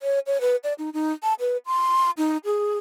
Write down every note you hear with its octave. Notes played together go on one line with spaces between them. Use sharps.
C#5
C#5
B4
D5
D#4
D#4
A5
B4
C6
D#4
G#4